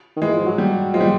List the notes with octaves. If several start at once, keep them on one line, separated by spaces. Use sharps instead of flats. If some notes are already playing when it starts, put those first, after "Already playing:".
D#3
E3 G#3
F3
F#3
G3
F3 G#3
G3